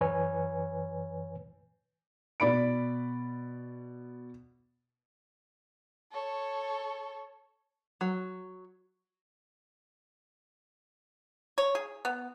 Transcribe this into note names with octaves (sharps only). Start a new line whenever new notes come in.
F#2 E3 B4 C#5 G#5
B2 D5 B5 D7
A4 C#5
F#3
C#5
G#4
B3